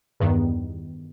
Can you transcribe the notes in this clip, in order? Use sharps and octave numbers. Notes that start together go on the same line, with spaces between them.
E2 G2 D#3 B3